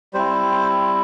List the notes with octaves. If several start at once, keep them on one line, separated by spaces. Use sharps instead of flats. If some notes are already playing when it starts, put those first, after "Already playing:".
G3 C4 E4 C5